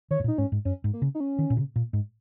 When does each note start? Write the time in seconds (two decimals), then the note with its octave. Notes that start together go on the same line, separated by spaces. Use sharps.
0.11 D#3 C#5
0.20 G#2
0.24 A#2
0.28 D#4
0.38 G#2 C#4
0.52 G#2
0.65 F#2 C#4
0.84 G#2
0.93 A#3
1.02 C#3
1.15 D#4
1.20 C#4
1.39 D#3
1.50 A#2
1.57 C#3
1.76 A#2
1.93 G#2